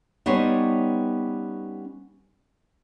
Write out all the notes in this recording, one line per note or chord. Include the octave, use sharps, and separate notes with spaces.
G3 B3 C#4 D#4 C5 C#5